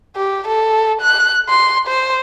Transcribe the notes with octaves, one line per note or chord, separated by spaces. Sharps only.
G4
A4
F#6
C6
C5